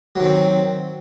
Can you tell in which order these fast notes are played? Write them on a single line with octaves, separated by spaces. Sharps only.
F#3 D#3 C4